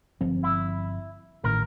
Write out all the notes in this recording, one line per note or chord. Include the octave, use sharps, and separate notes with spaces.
G1 F3 C4
E4
A1 A2 D#3 A#4